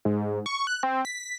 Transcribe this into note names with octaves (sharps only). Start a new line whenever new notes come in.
G#2
C#6
F#6
C4
B6